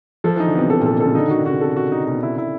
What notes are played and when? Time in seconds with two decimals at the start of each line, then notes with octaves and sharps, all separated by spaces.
0.24 F3 A4
0.36 E3 D#4
0.46 D3
0.55 C3 B3
0.70 C3 A4
0.81 A#2 A4
0.92 B2
1.00 C#3 A4
1.15 D3 D#4
1.27 D#3 F#4
1.39 D3
1.46 C#3 F#4
1.61 C3 A4
1.76 F#4
1.92 D#4
2.07 B2
2.23 E4
2.38 E4